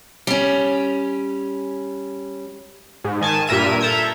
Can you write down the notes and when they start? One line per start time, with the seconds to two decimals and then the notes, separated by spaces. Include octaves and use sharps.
0.27 G3 C#4
3.04 G#2
3.21 D#3 G#5 A5
3.47 G2 A#2 A#4 E5 D#7
3.81 A4 E5 A#5 G6 G#6